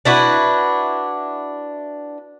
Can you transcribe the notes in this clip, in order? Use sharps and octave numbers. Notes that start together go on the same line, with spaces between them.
D4 E4 F#4 B4